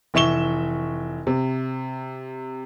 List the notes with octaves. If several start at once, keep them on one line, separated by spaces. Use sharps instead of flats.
F1 E3 E5 C#6 E7 G7
C3